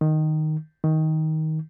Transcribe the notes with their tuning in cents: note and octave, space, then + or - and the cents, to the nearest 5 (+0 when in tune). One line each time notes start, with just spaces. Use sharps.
D#3 -5
D#3 +15